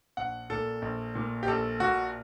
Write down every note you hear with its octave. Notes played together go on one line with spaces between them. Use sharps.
A#1 F#5
A#2 A4
A#1
A#2
G4
A#1 A4
A#2 F#4